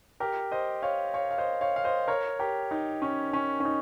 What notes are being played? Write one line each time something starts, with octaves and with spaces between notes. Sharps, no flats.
G4 A#4
C5 D#5
C#5 F5
C#5 F5
F5
C5 D#5
C#5 F5
F5
C5 D#5
A#4 C#5
G4 A#4
D#4
C#4
C#4
C#4
D#4